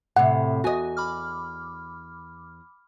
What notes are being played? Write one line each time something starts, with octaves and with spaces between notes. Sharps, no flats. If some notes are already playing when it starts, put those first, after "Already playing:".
A2 C3 F#5
E2 F#4 D#5 G#5
B5 D6 F6